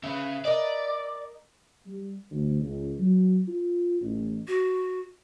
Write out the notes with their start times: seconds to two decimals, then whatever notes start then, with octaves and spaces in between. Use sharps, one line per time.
0.03 C#3 B4 E5
0.45 A#4 D5 D#5
1.87 G3
2.31 D2
2.61 C#2
3.00 F#3
3.47 F4
4.01 A1
4.47 F#4